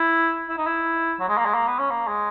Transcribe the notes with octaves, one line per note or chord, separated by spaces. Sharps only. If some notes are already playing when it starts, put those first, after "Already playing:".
Already playing: E4
E4
D#4
E4
F#3
G#3
A#3
G#3
A#3
B3
C#4
A#3
G#3